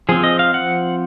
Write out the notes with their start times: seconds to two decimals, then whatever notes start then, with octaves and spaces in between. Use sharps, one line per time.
0.09 F3 C4 G#4
0.24 D#5
0.39 F5
0.54 F#5